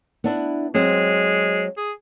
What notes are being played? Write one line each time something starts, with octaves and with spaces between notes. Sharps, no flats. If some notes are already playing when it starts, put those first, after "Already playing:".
B3 D4 E4
F#3 G#3 C4 C5
G#4